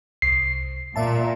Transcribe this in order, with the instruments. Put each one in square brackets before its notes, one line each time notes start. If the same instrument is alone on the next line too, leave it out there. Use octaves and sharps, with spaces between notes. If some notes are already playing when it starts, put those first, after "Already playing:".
[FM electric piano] C2 [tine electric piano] C7
[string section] A#2 [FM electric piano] D5 E5 A5